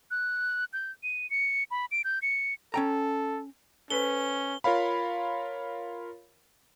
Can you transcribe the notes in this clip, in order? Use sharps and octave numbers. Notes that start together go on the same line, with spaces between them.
F#6
G6
D#7
C#7
B5
D7
G6
C#7
C#4 A4 G5 A#5
C#4 A4 B4 C5 G7
F4 A#4 C#5 F5 B5